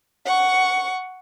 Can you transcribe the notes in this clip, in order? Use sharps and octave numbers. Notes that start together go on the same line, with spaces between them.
F#5 C#6